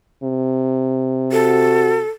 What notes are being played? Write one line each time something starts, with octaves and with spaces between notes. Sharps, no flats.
C3
F#4 A4